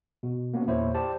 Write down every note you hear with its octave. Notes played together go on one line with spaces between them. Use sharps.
B2
A#3 B3 C#4 F#4
E2 A#2 A#3 E4 C5 C#5
G4 C5 D5 A5